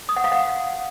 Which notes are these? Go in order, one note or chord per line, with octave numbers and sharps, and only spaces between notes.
D#6
F#5
F5
F#5